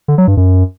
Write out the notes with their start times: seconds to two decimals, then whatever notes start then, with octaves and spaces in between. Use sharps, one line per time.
0.08 D3
0.18 F#3
0.27 G2
0.37 F#2